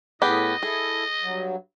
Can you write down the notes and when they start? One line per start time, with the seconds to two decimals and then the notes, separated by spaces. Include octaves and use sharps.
0.22 A2 B3 G4 G#4 D#5
0.63 E4 G#4 A4
1.22 G2 F#3